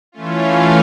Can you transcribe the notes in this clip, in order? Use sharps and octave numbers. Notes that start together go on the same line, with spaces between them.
E3 A3 C#4 F4